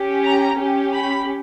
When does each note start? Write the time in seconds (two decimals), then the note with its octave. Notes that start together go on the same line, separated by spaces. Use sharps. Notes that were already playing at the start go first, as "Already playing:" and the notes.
Already playing: C#4 G4
0.25 A#5
0.59 C#4 G4
0.94 B5